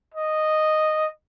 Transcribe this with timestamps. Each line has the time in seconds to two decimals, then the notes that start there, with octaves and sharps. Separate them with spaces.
0.14 D#5